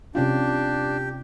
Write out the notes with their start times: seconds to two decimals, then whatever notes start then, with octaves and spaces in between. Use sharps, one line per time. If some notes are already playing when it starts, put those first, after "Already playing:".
0.15 C3 C#4 D4 F4 G4